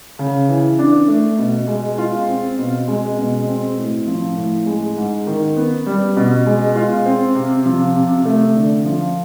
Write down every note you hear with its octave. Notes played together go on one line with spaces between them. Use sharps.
C#3
E3
D4
A3
B2
G#3
F4
C4
B2
G#3
B2
C4
A2
F3
A2
G#3
G#2
D#3
B3
G3
B2
G#3
F4
C4
C3
F3
C3
A3
D3
F3